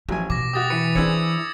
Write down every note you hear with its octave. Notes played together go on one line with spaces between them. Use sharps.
A1 F3 F#3 G#5
B2 D6 A#6
F#4 G4 G5 D#6 A6
E3 B4 C#7
C4 D4 E4 F4 G#4 E6 G#6 C#7